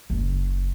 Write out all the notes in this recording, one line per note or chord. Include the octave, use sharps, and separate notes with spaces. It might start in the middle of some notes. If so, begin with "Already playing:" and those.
F#1